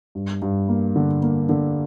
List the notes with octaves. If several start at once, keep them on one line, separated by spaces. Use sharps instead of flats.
G2
G2
A#3
D3
A#3
D3